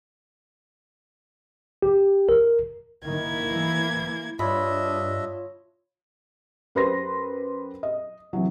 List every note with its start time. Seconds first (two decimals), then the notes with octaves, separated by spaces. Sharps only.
1.82 G4
2.29 A#4
3.07 D#3 A#3 E4 G#6
3.51 E3
4.39 G2 D4 F4 C#5 D#5 E5 B5
6.75 F#2 G4 B4 C5 C6 A#6
7.83 D#5
8.33 C3 E3 F#3